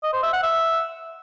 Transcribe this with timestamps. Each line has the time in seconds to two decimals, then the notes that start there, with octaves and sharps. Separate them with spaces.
0.03 D#5
0.13 C5
0.23 E5
0.33 F#5
0.43 E5